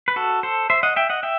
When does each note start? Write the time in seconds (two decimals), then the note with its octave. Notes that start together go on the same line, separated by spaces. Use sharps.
0.08 B4
0.16 F#4 A4
0.43 A4 C5
0.70 C5 E5
0.83 D#5 F#5
0.96 E5 G5
1.10 D#5 F#5
1.23 E5 G5